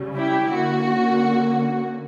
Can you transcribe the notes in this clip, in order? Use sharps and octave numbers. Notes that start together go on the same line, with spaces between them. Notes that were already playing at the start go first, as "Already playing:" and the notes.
Already playing: C#3 G3 C#4
E4 G4
D3 A#3 C#4 F#4